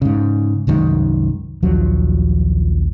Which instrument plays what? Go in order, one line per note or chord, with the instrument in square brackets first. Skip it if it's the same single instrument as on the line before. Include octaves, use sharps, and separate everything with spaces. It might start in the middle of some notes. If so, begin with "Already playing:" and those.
[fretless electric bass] G#2 C#3
C2 F#2 D#3 G#3
A#1 D#2 F3 F#3